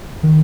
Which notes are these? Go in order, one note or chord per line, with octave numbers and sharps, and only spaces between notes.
D#3